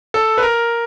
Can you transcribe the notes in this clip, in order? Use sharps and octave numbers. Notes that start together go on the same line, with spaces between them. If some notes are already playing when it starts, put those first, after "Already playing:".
A4
B4
A#4